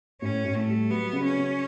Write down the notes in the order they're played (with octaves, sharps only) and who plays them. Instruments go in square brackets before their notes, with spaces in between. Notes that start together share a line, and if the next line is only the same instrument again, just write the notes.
[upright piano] A2 [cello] C#4
[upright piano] A2
[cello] A3
[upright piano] G3
[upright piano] F#3 [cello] B3
[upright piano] C#3
[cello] C#4
[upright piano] C#3